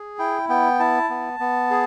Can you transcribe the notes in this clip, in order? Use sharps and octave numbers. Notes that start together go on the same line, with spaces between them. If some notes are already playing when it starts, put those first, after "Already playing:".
Already playing: G#4
E4 G5
B3 G5
E4 A5
B3
B3
G#4